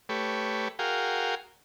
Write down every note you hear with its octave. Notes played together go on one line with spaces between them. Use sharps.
A3 G4 B4 C#5
F#4 G#4 A#4 F5 G5